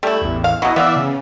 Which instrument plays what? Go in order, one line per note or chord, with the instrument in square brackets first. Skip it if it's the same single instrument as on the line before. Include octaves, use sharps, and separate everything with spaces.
[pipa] G3 E4 [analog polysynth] A3
[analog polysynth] A1 E2
[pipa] F5
[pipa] B2 F#3 [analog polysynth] E4 D#5
[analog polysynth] E3 D5 E5 [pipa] B3 F5
[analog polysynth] C#3